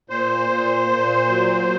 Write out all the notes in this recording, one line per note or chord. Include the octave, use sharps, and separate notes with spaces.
A#2 C5
A#2
A#2
F#3